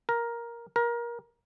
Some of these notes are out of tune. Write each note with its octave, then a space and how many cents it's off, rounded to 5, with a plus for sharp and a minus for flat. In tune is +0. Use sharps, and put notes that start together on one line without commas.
A#4 +10
A#4 +25